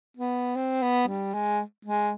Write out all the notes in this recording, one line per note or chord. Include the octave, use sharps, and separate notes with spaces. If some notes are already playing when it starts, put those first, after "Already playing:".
B3
C4
B3
G3
G#3
G#3